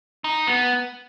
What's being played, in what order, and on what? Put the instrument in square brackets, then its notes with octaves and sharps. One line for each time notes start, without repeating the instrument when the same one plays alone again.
[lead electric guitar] D#4
B3